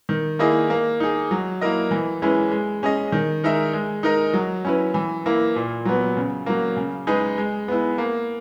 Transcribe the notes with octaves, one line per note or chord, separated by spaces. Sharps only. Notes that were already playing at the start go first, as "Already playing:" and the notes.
D#3
A#3 E4 G#4 D#5
A#3
D#4 G#4
F#3
A#3 E4 A#4 D#5
E3
G#3 C#4 E4 B4
G#3
C#4 G#4 D#5
D#3
G#3 D#4 A#4 E5
G#3
D#4 A#4 D#5
F#3
C#4 E4 B4
E3
A#3 E4
A#2
F#3 B3
C#3
F#3 A#3
C#3
G#3 D#4 G#4 B4
G#3
B3 E4
A#3